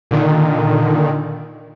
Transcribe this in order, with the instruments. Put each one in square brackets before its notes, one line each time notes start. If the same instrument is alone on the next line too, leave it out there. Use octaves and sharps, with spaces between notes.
[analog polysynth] A#2 D3 D#3